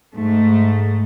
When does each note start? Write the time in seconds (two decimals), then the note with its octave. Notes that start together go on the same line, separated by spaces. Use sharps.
0.14 G#2 A3